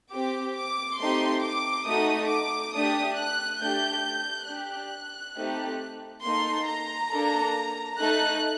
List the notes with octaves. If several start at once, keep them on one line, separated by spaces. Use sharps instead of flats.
C4 G4 D6
D6
A3 C4 D#4 G4 C6
D6
A3 D#4 F#4 D#6
D6
A3 D4 G4 D#6
F#6
A3 D4 G4 G6
D4 G4 F#6
A3 C4 D#4 G4
A#3 D#4 A4 C6
A#5
A#3 D4 A4
A3 D#4 A4 F#6